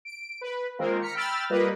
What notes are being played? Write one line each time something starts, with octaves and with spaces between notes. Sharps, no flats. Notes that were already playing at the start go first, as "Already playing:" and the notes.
D7
B4
D#3 G#3 A#3 C4 F4 A#4
A#5 F6 B6 C#7
G5 B5 E6 F6 A6
G3 A#3 F4 A#4 B4 D#5